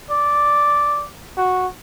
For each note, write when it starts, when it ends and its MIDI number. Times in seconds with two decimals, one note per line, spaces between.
0.11 1.07 74
1.37 1.67 66